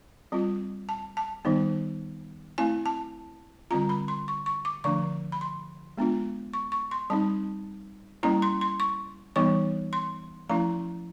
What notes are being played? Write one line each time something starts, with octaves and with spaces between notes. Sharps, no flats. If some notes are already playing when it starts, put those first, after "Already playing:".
G3 C4 F4
A5
A5
D#3 G3 B3 D#4
A3 C4 E4 G#5
A5
D3 G3 C4 F4 A#5
B5
C6
C#6
C#6
D6
D3 F3 A3 D4 C#6
B5
C6
G#3 B3 D4 F4
C#6
C#6
C6
G3 C4 D#4 A5
G3 A#3 C#4 E4 A#5
C6
C6
C#6
E3 G3 B3 D#4 C#6
C6
F3 A3 C#4 E4 A#5